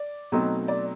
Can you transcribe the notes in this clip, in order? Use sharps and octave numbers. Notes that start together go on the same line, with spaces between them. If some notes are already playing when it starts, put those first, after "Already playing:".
Already playing: D5
B2 F#3 A3 C4 D#4
D5